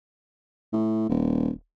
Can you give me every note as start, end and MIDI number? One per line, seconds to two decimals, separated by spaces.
0.73 1.07 45
1.10 1.51 27